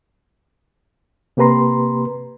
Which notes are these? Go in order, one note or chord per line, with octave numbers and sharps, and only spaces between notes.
C3 A#3 G4 B4 A#5 C6